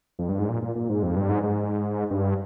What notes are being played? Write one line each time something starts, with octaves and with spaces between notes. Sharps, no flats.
F2
G2
G#2
A#2
A#2
A#2
G#2
F2
G2
G#2
G#2
G2